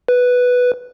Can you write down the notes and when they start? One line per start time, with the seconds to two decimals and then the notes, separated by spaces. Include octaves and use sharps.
0.08 B4